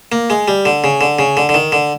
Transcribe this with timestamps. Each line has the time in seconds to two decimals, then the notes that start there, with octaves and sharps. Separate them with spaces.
0.12 A#3
0.30 G#3
0.48 G3
0.65 D3
0.84 C#3
1.01 D3
1.19 C#3
1.37 D3
1.49 D3
1.54 D#3
1.72 D3